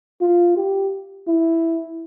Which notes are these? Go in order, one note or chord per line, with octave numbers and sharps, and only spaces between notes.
F4
G4
E4